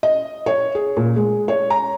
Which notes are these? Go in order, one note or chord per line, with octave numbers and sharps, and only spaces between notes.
D#5
C#5
G#4
A#2
G#3
C#5
A#5